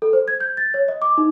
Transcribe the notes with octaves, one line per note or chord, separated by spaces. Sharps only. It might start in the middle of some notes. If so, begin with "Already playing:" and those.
A4
C5
G#6
G6
A6
C#5
D#5
D6
D#4